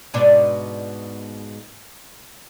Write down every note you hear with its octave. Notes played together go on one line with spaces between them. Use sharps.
G#2 B2 D4